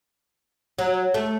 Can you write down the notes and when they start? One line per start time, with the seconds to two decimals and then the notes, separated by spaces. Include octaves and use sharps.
0.78 F#3
1.14 A3